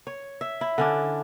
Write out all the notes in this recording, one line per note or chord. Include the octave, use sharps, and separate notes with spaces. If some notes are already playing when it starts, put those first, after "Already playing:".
C#5
E5
E4
D3 C#4 D4